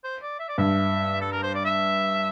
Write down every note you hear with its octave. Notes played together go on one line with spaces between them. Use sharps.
C5
D5
E5
D5
G2 E5
A4
A#4
C5
D5
E5